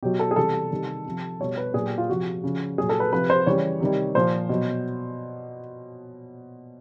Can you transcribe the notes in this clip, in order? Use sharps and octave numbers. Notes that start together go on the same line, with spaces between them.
B2 F#3 G4
A4
G#4
C3 E3 G3 A4
C3 D#3 G3
C3 F3
B2 G3 C#5
B4
A#2 F#3 G#4
G4
F4
C3 F3 F#4
C#3 F3
A#2 F#3 G#4
A4
B4
C3 F3 B4
C5
C#3 E3 G3 C#5
C3 D#3 G3
A#2 F3 C5
B2 F#3